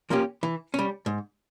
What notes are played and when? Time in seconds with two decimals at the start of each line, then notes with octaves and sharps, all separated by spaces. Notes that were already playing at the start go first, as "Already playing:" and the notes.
0.10 F3 A#3 C#4 G4
0.43 E3
0.74 G3 C#4
1.06 G#2